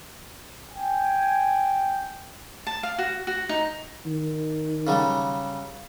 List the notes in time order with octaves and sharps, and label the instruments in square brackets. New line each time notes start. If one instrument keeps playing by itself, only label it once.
[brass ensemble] G5 G#5
[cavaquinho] A5
F5
F#4
F#4
D#4
[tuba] D#3
[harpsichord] C#3 F#3 G3